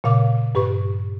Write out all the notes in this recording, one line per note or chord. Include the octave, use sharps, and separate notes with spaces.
A#2 C#3 F5 D6
G2 G4 B4 C#6